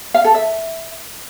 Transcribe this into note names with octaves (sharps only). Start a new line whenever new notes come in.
F5
A4
E5